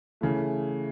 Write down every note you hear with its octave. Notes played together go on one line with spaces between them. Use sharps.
C#3 E3 A3